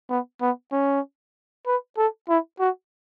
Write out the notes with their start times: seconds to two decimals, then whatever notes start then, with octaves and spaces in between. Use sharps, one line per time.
0.09 B3
0.41 B3
0.72 C#4
1.66 B4
1.97 A4
2.28 E4
2.60 F#4